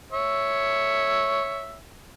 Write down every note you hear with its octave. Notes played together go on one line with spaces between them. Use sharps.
C#5 E5